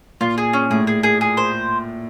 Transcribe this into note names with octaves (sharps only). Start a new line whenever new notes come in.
A#2 F4
G#4
C#4
A2 G#4
G#4
G#4
G#4
C5